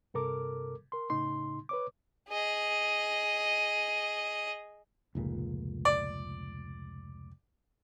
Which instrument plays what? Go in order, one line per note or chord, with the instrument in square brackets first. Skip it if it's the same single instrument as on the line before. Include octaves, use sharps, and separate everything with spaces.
[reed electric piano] G2 C3 A4 A#4 D6
A#4 C6
A2 C#3 D#4 C6
B4 C#5 D6
[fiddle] G#4 D#5
[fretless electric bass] F1 C#2 A#2
[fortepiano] D5